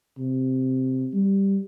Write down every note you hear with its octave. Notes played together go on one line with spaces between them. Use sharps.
C3
G3